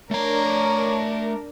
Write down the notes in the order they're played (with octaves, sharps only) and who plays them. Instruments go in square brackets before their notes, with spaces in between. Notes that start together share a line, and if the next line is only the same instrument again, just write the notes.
[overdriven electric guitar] A3 A#5 [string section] D4 A#4 [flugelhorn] C#5